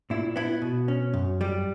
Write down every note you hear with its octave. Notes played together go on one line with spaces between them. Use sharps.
A#2 E4
B3 E4
B2
C#4
F#2
G3